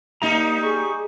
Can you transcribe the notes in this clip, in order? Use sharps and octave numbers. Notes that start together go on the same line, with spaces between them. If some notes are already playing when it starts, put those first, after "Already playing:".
G3 A#3 D#4 D#5 A#5
G#4 C#6